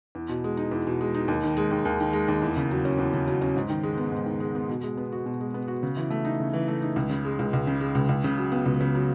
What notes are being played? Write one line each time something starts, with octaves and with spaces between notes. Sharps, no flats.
E2
B2
G#3
D#4
E2
B2
G#3
D#4
D#2
D#3
G#3
D#2
D#2
D#3
G#3
D#2
E2
C#3
F#3
C#4
E2
C#3
F#3
C#4
G#2
D#3
G#3
B3
G#2
D#3
G#3
B3
B2
G#3
B3
F#4
B2
G#3
B3
F#4
C#3
E3
A3
D#4
C#3
E3
A3
D#4
C#2
C#3
G#3
C#2
C#2
C#3
G#3
C#2
C#2
C#3
F#3
B3
C#2
C#3
F#3